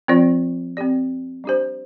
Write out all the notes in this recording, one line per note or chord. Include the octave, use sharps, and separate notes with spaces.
F3 C4 F4 D5
C4 G4 D5
G3 D4 G4 C5